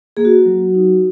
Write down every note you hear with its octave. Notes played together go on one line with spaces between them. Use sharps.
A#3 G#4
F#4
F#3 F#4
D#4